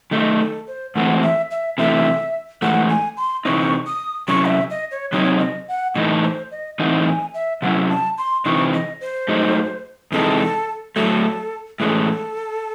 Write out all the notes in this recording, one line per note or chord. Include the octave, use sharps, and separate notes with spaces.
D#3 A3 D#4 D#5
A4
C5
G#2 E3 A3 C4 F#5
E5
E5
C3 E3 A3 E5
G#2 E3 A3 F#5
G#5
C6
C3 E3 C4 D#4 C#6
D#6
C3 F#3 C#4 E4 C#6
D#5
E5
D#5
C#5
C3 F#3 C4 D#4 C#5
D#5
F#5
A2 E3 A3 D#4 D#5
C5
D#5
A2 E3 C4 D#4 F#5
G#5
E5
C3 F#3 C#4 E4 F#5
A5
C6
C3 E3 C4 D#4 C#6
D#5
C5
G#2 F#3 A3 D#4
E2 C3 E3 G#3 D#4 A4
A2 F#3 A3 A4
A2 E3 G#3 C#4 A4